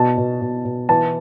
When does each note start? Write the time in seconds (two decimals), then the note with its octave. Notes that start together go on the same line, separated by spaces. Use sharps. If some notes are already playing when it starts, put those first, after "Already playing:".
Already playing: B2 A5
0.18 B2
0.42 B2
0.65 B2
0.89 E3 A5